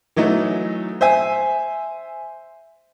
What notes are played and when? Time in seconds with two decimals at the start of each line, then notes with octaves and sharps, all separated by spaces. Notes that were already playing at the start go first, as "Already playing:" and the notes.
0.16 E3 F#3 A3 D#4
1.01 C5 E5 G#5